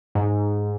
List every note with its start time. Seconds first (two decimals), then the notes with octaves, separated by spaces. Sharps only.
0.15 G#2